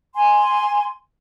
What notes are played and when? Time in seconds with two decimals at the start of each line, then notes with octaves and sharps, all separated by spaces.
0.15 G#5 C6